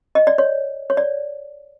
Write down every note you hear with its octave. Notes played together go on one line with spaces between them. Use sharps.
D#5
D5
C#5
C#5
D5